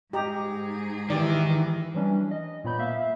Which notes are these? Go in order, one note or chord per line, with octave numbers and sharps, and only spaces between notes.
G#2 G4 G#4 D#5 A#5
D#3 E3 G4 D5
E3 F#3 G3 C#4 D4
D#5
A#2 B3 C#5 B5 G6
A#3 B3 E5 F5